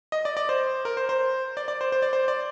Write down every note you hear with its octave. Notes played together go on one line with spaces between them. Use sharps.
D#5
D5
D5
C5
A#4
C5
C5
D5
D5
C5
C5
D5
C5
D5